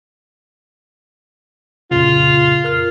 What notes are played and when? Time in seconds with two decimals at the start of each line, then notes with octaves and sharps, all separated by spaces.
1.91 F2 A#2 C#3 F4
2.64 A#4 F6